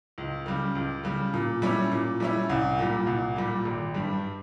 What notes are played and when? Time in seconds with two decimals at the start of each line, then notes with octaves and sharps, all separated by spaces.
0.18 C#2
0.46 C#3 G3
0.75 C#2
1.04 C#3 G3
1.34 A#2
1.62 G3 C#4 E4
1.91 A#2
2.20 G3 C#4 E4
2.50 C2
2.79 A#2 G3
3.07 C2
3.36 A#2 G3
3.65 G#1
3.94 G2 G3